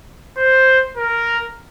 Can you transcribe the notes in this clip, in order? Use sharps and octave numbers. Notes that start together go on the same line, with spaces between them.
C5
A#4